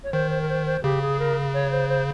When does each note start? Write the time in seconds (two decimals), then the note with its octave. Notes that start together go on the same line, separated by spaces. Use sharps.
0.04 C#5
0.13 D#3 C5
0.30 C5
0.41 A#4
0.49 C5
0.66 C5
0.83 C#3 G4
1.02 G#4
1.19 A#4
1.54 C#5
1.71 C5
1.89 C5